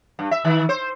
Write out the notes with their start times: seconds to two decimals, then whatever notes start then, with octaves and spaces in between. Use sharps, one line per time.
0.19 G2
0.31 E5
0.44 D#3
0.69 C5